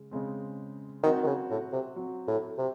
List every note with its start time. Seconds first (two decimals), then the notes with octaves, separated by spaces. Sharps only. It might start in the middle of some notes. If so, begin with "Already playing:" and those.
Already playing: C#3 G#3
0.11 C#3 G#3 C4
1.03 D#3 F#3 C4 F#4
1.23 D#3
1.27 C#3
1.51 A2
1.73 C3
1.96 F#3 C4 F#4
2.28 A2
2.58 C3